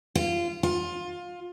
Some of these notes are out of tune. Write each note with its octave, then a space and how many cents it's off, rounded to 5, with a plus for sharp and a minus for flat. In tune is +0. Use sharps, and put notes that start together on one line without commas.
F4 -20
F4 +20